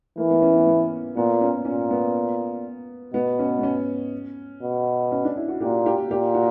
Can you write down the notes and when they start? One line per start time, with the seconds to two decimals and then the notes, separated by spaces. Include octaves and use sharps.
0.18 E3 A#3
0.30 B3
0.42 C#4
0.54 B3
0.66 B3
1.16 A#2 B3
1.41 C#4
1.65 A#2 C#4
1.91 B3
3.13 B2 B3
3.39 C#4
3.59 B3
3.63 C#4
4.62 B2
5.12 C#4
5.24 D4
5.36 E4
5.48 F#4
5.61 A#2 G4
5.86 G4
6.10 A#2 G4
6.34 F#4